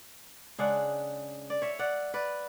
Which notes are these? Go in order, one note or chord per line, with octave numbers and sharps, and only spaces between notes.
C#3 G#3 D4 D5 F#5
D5
C#5 E5
D5 F#5
B4 D5